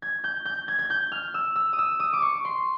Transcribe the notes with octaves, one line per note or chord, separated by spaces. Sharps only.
G#6
G6
G6
G#6
G#6
G6
F6
E6
E6
D#6
E6
D#6
D6
C#6
C6